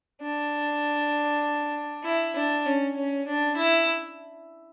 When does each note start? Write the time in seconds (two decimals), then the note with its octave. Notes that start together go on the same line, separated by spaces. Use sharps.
0.22 D4
2.04 E4
2.35 D4
2.66 C#4
2.96 C#4
3.27 D4
3.57 E4